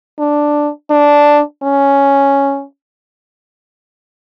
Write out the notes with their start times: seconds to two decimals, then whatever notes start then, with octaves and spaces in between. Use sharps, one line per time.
0.19 D4
0.90 D4
1.63 C#4